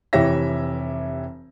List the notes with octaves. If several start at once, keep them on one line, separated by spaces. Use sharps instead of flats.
F1 E3 G4 C#5 E5 A#6